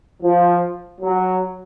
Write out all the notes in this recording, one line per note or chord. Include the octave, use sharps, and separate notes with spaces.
F3
F#3